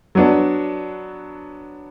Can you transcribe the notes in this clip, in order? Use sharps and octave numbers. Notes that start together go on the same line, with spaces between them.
F#3 B3 D4